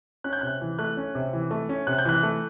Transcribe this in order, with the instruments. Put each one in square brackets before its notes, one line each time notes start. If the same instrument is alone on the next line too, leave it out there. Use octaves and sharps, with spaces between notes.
[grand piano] C#4 F#6
G6
C3 F#6
E3
A3 F#6
C#4
C3
E3
A3
C#4
C3 F#6
G6
E3 F#6
A3